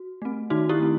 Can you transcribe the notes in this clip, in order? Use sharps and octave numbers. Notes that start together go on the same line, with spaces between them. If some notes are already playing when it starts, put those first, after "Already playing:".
Already playing: F#4
A3 C4
D#3 D#4 F#4
E4 G4
A3 C4